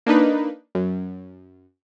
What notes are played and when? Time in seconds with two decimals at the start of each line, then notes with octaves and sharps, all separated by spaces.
0.06 A#3 D4 D#4 B4
0.75 F#2